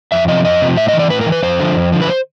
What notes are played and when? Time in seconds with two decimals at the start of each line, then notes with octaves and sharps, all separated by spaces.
0.12 F2 E5
0.28 C3 F3 D#5
0.44 F2 D#5
0.62 C3 F3
0.77 A2 E5
0.88 D#5
0.93 E3
0.99 D5
1.10 A2 B4
1.21 A#4
1.26 E3
1.32 B4
1.43 F2 C5
1.59 D3 F3
1.76 F2
1.92 D3 F3
2.02 B4
2.08 C5